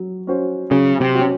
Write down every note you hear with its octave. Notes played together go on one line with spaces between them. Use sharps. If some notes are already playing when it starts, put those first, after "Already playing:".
Already playing: F#3
C#4 F#4 C5
C#3 F#3
C3
C#4 F#4